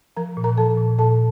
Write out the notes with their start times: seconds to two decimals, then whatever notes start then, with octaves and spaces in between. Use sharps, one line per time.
0.17 F3 A#4 A#5
0.37 A#2
0.44 A#4 A#5
0.58 F3 A4 A5
0.78 A#2
0.98 A#2 A4 A5